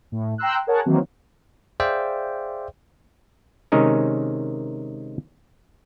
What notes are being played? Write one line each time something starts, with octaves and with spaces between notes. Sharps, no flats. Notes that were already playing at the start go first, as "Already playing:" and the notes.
A2
G5 A#5 C6 E6 F#6
G#4 A#4 C#5 F#5 A5
D#3 E3 F#3 A#3 C4
G#4 C5 D5 E5 F5 G5
C3 D#3 G#3 C#4 D#4 A#4